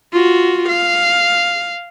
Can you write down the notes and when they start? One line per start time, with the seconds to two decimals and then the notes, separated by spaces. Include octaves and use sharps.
0.13 F4 F#4
0.68 F5